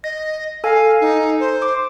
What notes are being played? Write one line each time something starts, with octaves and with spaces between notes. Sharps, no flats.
D#5 A#6
A4 F5 G#5
D#4
C5
D6